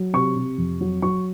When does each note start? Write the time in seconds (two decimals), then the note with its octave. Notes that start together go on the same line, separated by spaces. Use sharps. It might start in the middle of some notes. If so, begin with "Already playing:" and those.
Already playing: F#3
0.13 C3 C#6
0.36 C3
0.58 F2
0.81 F#3
1.02 F#3 C#6